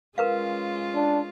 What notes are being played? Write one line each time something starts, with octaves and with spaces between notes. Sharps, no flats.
G#3 C#4 F4 A#4 B4 F5
D4